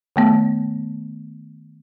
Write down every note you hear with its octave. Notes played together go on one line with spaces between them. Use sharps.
D#3 A3 B3